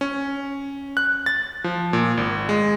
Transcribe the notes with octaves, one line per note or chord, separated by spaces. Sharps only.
C#4
F#6
A6
F3
A#2
G#1
G#3